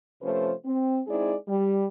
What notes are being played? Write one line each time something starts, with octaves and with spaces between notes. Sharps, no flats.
C3 F3 A3 C#4 B4 C5
C4
G#3 C4 D#4 E4 G#4 D5
G3